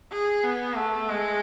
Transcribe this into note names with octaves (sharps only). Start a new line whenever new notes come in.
G#4
B3
A3
G#3